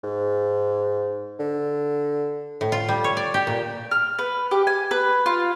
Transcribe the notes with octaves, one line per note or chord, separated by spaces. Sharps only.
G#2
D3
A2
F4
G3
C#5
D5
G4
A#2
F6
B4
G4
G#5
B4
F4